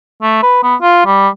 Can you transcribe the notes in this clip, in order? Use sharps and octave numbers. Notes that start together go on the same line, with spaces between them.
A3
B4
B3
F4
G3